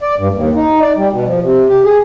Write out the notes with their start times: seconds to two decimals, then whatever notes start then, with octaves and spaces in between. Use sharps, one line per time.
0.01 D5
0.18 G2
0.34 D#2
0.55 D#4
0.81 D5
0.97 G3
1.12 B2
1.26 F3
1.42 C3
1.69 G4
1.84 G#4